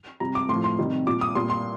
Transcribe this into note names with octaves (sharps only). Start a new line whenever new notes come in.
C3 G3 A#5
D6
A2 F3 C6
C6
C3 D#3 G3
A#2 G3 D6
D#6
A#2 G3 C6
C6